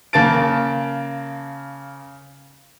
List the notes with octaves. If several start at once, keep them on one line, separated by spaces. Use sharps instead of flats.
C#3 A#3 A5 A6 D7